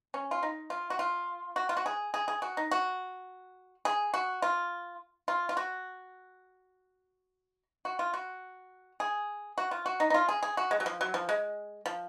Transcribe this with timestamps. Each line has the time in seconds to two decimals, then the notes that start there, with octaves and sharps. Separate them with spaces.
0.14 C#4
0.31 F4
0.43 D#4
0.70 F4
0.90 F#4
0.99 F4
1.56 F#4
1.69 F4
1.77 F#4
1.86 G#4
2.14 G#4
2.28 G#4
2.42 F#4
2.57 D#4
2.71 F#4
3.85 G#4
4.14 F#4
4.42 F4
5.28 F4
5.49 F4
5.57 F#4
7.85 F#4
7.99 F4
8.14 F#4
9.00 G#4
9.58 F#4
9.71 F4
9.86 F#4
10.00 D#4
10.10 D#4
10.14 F4
10.29 G#4
10.43 G#4
10.57 F#4
10.71 G#3
10.80 F#3
10.86 F3
11.01 F#3
11.14 F3
11.29 G#3
11.86 F3